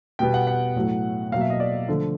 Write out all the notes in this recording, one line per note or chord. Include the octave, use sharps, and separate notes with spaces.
B2 G3 B3 G5
F#5
F#5
A2 F#3 A3
B2 F#3 A#3 F5
E5
D#5
D5
D3 F3 A3